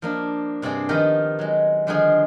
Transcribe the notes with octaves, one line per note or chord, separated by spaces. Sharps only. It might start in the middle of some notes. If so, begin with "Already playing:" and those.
F3 A#3 D4
G2 C3 C4 G#4 D5
D#3 F3 B3 G4 A#4 D#5
F#3 G#3
D3 D#3 F3 G3 D#4 G#4